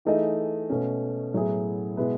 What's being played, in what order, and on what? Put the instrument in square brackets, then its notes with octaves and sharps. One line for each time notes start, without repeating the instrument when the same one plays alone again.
[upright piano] E3 A3 D#4 G#4 D#5
B2 A3 C#4
A2 F#3 B3 E4 G#4
B2 G#3 B3 E4 B4